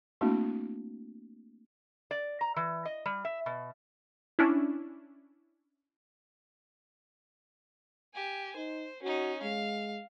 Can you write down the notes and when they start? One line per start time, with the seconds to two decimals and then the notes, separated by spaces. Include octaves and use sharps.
0.21 A3 A#3 C4 D4 E4 F#4
2.11 D5
2.41 A#5
2.56 E3
2.85 D#5
3.06 G3
3.25 E5
3.46 B2
4.39 C#4 D4 E4
8.14 G4 G#5
8.56 D#4 C5
9.03 C#4 D#4 F#4
9.43 G#3 F5